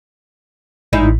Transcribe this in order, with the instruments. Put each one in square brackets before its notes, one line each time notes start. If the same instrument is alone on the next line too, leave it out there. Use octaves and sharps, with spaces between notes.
[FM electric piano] A1 [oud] G#2 D#4 E4